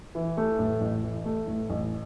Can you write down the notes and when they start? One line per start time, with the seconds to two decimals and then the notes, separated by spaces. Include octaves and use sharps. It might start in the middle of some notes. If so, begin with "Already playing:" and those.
0.15 E3
0.37 A3
0.59 A2
0.81 A1
1.04 E3
1.25 A3
1.47 A2
1.70 A1